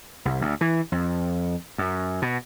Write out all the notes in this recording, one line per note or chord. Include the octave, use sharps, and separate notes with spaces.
C2
D2
E3
F2
F#2
B2